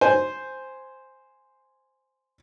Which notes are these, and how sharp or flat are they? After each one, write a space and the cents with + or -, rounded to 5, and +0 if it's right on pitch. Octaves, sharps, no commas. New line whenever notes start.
C5 +0 G#5 +0